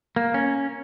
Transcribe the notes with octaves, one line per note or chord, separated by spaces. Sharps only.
A#3
C#4